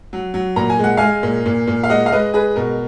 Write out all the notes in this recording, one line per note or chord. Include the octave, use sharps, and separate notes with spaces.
F#3
F#3
A#2 A#5
G#5
G#3 F#5
G#3 F5 G#5
A#2
A#2
A#2
F5
G#3 D#5 F#5
F5
G#3 B4 D#5
G#3 G#4 B4
B2 A#4